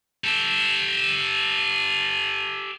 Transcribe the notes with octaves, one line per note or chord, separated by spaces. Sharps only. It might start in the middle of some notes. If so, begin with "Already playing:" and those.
G4 A4